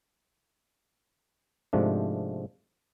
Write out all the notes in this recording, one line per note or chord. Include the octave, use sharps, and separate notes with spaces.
G#2 C3 F3 G#3 A3 D4